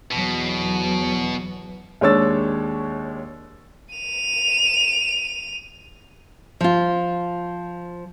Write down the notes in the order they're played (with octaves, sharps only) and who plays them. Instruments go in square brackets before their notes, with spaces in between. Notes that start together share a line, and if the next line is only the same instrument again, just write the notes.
[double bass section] E2 F#3 [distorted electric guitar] B2
[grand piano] D#2 G#3 D4 C#5 E6 A6
[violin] D#7 F7
[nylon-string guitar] F3 F4